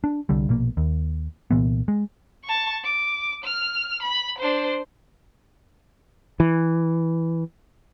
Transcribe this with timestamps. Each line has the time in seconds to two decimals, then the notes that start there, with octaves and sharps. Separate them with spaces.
0.04 D4
0.29 C2 D3 G3
0.49 A#1 B2 A#3
0.77 D#2
1.51 C2 A#2 E3 B3
1.88 G#3
2.44 A5 C#6
2.83 D6
3.44 F6
4.02 B5
4.38 D4 C5
6.40 E3